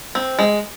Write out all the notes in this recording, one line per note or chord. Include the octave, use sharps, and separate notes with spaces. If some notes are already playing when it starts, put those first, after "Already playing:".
C4
G#3